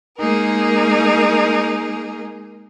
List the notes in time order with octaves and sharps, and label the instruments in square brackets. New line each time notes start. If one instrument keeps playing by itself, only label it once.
[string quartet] G#3 A#3 D#4 G#4 A#4